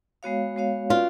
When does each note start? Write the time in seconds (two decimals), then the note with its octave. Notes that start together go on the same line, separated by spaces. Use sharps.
0.23 G#3 B3 F#4 C#5 F5
0.56 G#3 B3 F#4 C#5 F5
0.90 C#4 F4 F#4 B4 D5